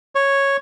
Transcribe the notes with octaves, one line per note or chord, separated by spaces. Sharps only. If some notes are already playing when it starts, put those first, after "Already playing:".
C#5